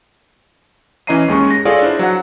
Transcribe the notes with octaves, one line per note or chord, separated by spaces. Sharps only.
E3 C#4 D#5 A#5 C7 D#7
D#2 G#3 C#4 C#6
A#6
F4 G#4 A4 C#5 D5 F5
D4 E4 C5
F#3 F#5